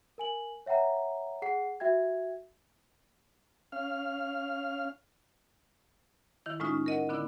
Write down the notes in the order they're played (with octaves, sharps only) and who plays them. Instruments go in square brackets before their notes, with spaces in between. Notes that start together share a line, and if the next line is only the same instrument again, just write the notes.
[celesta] A#4 G#5 F#7
C#5 E5 F#5 G5 A#5
G#4 F#5 C7
F#4 E5 G5 G#6
[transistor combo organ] C#4 F5 F6
[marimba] D#3 E4
A2 G#3 C#4 D#4 F4
A#4 D#5 F#5
D3 B3 D4 E4